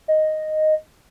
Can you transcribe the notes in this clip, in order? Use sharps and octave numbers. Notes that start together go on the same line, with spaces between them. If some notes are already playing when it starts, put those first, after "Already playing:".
D#5